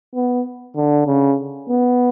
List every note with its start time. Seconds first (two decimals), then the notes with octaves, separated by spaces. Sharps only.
0.15 B3
0.76 D3
1.07 C#3
1.69 B3